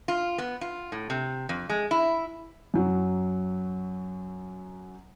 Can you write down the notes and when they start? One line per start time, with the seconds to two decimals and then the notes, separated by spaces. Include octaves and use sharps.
0.08 F4
0.38 B3
0.61 F4
0.92 A2
1.10 C3
1.49 F2
1.69 G#3
1.91 E4
2.74 F#2 F#3